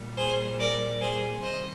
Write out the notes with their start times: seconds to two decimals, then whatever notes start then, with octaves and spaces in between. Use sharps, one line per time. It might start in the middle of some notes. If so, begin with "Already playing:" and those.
Already playing: A#2 G3
0.17 G#4 C5
0.59 A#4 D5
1.00 G#4 C5
1.42 C3 D#3 G3 C5 D#5